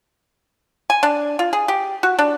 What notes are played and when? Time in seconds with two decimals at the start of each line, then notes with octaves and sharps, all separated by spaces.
0.90 G#5
1.03 D4
1.39 F4
1.53 G#4
1.68 G4
2.03 F#4
2.19 D4